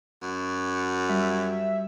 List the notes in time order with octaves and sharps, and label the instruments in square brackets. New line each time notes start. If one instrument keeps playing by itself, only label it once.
[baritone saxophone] F#2
[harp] G3 [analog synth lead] E5